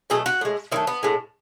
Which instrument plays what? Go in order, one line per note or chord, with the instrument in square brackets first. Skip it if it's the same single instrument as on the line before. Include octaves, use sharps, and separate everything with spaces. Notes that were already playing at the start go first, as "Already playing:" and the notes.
[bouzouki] B2 F#3 A3 G#4
F#4
A2 G#3
D#3 F#3 A3 E4
B3
A2 G#3